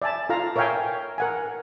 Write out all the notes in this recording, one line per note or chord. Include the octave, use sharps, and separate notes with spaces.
D5 E5 G#5 A5
F4 A4 F5 A#5
A#4 C#5 E5 F5 G5 G#5
A#4 F#5 G#5